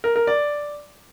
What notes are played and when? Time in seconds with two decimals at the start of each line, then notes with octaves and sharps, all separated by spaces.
0.04 A#4
0.16 A#4
0.27 D5